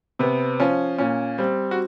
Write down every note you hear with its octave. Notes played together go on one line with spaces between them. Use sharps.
C3 B3
F3 C#4
A#2 C#4
G3 C4
F#4